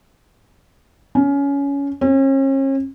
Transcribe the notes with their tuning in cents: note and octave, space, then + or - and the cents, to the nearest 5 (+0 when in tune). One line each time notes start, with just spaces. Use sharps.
C#4 +20
C#4 -40